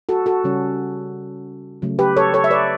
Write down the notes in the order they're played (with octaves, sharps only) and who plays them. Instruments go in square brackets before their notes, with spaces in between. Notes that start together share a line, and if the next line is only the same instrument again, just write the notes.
[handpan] F#4 A4
F#4 A4
C#3 G3 C#4
C#3 F#3 A3
G4 B4
A4 C#5
A4 C#5
E5
B4 D5